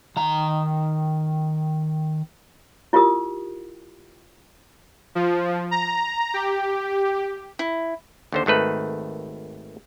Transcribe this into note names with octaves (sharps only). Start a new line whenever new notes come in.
D#3 A#5
E4 F4 G4 A#4 D#6
F3
A#5
G4
E4
D#2 D3 C5
G#1 D#3 A3 B4